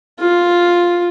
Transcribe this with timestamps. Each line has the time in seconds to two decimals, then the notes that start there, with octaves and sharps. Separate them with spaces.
0.20 F4